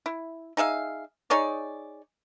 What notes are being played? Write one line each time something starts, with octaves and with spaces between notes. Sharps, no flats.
E4
D#4 G#4 E5 F5
D#4 G#4 C#5 D5